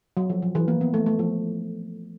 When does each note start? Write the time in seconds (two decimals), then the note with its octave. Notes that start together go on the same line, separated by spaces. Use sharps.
0.17 F#3
0.30 F3
0.42 F3
0.55 E3
0.68 A#3
0.81 B3
0.94 A3
1.06 A3
1.19 F3